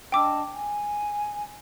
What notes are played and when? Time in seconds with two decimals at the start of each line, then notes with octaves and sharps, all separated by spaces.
0.12 D4 D#5 G5 A5 D6 E6
0.53 G#5